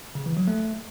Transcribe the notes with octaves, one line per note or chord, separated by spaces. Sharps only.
C#3
E3
F#3
A3